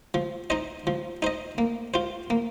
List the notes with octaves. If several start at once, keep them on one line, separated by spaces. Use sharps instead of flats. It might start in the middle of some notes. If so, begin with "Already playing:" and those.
F3
D#4 C5 D#5
F3
D#4 C5 D#5
A#3
F4 C5
A#3